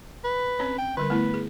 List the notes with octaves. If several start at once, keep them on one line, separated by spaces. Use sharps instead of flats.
B4
C4 C#4 C#5
G5
D3 G3 A#4 B4
A3 B3 E4
G#4